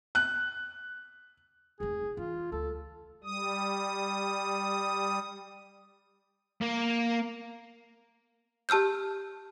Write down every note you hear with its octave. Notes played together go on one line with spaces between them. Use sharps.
F#6
F1 D#4 G#4
E3 F4
D2 A4
G3 D#6
A#3
G4 A5 E6 F6 G6